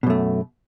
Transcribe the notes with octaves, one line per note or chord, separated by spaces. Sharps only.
F#2 B2 A3